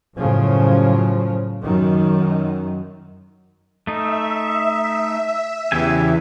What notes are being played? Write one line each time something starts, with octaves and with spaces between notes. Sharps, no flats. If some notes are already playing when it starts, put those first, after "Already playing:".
F#2 A2 C#3 F3
F#2 D#3
A3 D#4 E5
E2 C#3 E3 G4 G#5